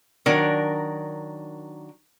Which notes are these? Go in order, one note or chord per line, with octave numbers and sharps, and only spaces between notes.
D#3 F#3 D4 A#4